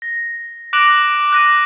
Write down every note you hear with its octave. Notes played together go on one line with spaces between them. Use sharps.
A#6
D6 F#6 A#6 D7 E7 F#7
F#6 A#6 D#7